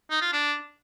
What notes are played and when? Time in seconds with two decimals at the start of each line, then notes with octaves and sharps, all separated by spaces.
0.11 D#4
0.22 F4
0.33 D4